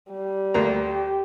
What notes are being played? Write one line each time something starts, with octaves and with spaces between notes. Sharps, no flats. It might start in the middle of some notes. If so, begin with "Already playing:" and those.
G3
D2 A#3 A#5
G4